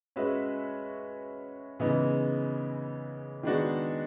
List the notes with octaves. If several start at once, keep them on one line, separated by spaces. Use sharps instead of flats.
G#3 C#4 F#4 B4 E5
C#3 E3 G#3 B3 D#4
D#3 G#3 B3 D4 F#4